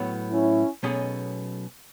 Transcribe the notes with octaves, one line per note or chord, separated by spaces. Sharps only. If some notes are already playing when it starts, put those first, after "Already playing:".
Already playing: A2 F#3 B3
C#4 E4
B1 B2 A3 C#4 G#4